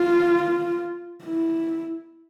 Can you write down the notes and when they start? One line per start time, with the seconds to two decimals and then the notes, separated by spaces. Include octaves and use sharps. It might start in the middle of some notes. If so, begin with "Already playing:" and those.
Already playing: F4
1.24 E4